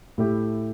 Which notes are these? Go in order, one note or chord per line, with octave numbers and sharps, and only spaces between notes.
A2 A3 E4 G4